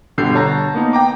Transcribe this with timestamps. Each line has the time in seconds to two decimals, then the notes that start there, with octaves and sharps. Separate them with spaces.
0.18 G1 B2 D3 G3 G6 C7
0.35 C#5 A5 A#5
0.74 A#3 B3 D#4
0.93 G5 A#5 D6